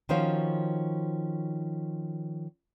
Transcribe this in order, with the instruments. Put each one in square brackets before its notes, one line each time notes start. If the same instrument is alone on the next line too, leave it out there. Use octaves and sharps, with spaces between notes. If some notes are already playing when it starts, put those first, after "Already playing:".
[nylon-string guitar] D#3 F3 C#4 F#4 C5 F5